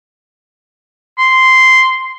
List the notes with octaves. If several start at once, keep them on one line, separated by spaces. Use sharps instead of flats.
C6